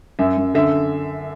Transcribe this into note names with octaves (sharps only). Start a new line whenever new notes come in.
F#2 E5
F#2
D3 E5